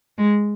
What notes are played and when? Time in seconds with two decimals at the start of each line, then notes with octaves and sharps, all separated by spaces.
0.17 G#3